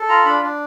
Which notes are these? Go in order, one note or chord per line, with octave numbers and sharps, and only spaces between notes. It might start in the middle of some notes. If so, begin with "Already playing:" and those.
Already playing: A4
F4 A#5
D4 B5
D4